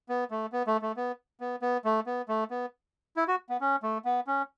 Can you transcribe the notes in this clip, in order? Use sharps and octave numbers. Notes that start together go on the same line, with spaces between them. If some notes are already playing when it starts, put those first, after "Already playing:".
B3
A3
B3
A3
A3
B3
B3
B3
A3
B3
A3
B3
E4
F#4
B3
C#4
A3
B3
C#4